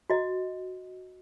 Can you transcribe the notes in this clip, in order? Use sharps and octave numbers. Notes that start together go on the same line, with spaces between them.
F#4 D#5